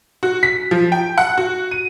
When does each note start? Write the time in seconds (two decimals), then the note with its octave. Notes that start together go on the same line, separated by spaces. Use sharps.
0.23 F#4
0.43 B6
0.71 F3
0.92 G5
1.18 F#5
1.38 F#4
1.71 D#7